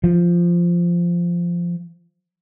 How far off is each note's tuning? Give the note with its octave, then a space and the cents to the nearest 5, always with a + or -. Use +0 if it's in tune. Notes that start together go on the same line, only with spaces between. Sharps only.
F3 -10